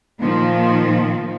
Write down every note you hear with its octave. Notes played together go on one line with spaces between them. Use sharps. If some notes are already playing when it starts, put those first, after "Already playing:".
A#2 D#3 F3